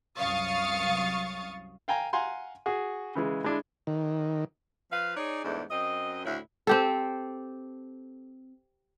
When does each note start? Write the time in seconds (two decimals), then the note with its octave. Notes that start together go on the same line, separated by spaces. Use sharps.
0.18 C2 F#2 F5 C#6 D#6 A6
1.88 F5 G5 G#5 A#5
2.13 F5 F#5 G#5 A#5 C6
2.66 F#4 G#4
3.15 C#3 E3 G#3
3.44 G#3 D4 E4
3.87 D#3
4.92 F3 B4 F5
5.17 D#4 G#4 C#5 D5
5.45 E2 G#2 A3 D4
5.71 F#2 C4 D#5
6.26 D2 A2 C#3 E4
6.67 C4 G4 A4